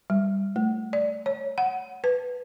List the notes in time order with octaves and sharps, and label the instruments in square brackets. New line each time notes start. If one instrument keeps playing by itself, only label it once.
[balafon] G3
A3
D5
C#5
F#5
B4